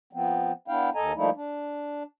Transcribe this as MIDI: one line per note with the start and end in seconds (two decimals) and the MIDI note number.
0.13 0.52 53
0.13 0.52 59
0.13 0.52 60
0.68 0.90 59
0.68 0.90 62
0.68 0.90 64
0.68 0.90 77
0.68 0.90 79
0.95 1.12 39
0.95 1.12 69
0.95 1.12 75
0.95 1.12 80
0.95 1.12 82
1.16 1.30 53
1.16 1.30 55
1.16 1.30 57
1.16 1.30 58
1.16 1.30 63
1.16 1.30 64
1.35 2.03 62